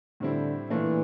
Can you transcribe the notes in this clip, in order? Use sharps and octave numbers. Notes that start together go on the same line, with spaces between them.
A2 D3 G3 C4 E4
A#2 E3 A3 D4